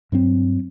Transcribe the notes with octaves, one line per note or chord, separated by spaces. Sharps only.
G2 F#3 C4